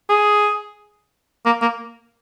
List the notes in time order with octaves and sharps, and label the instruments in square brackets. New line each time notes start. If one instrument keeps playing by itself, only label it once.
[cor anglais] G#4
A#3
A#3